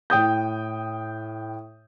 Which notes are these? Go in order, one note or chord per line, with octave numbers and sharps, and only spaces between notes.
A2 G5 D#6 G6